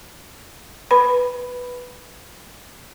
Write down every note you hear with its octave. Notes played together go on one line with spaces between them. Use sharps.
B4 B5